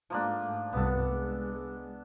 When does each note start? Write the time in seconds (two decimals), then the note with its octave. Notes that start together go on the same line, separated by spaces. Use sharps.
0.10 G#2 F3 A3 A#3 D4
0.73 C2 G2 F#3 B3 A4
1.08 G#3